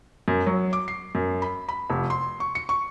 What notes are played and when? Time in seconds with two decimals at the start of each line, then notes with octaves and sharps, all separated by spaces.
0.28 F#2
0.46 F#3
0.73 D6
0.88 C7
1.15 F#2
1.42 B5
1.69 B5
1.90 F1
2.10 C6
2.40 C#6
2.55 C#7
2.69 C#6